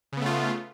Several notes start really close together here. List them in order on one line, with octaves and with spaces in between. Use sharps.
C#3 B3 A3 F4